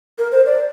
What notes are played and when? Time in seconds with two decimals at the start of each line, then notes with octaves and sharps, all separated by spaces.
0.19 A#4
0.32 C5
0.46 D5